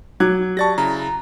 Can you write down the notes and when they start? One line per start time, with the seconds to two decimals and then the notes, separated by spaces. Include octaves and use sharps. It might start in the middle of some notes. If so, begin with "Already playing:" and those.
0.20 F#3 D6 F#6 G#6
0.57 G4 D5 A5 C#6 A6 A#6
0.78 C#3 E4 A#5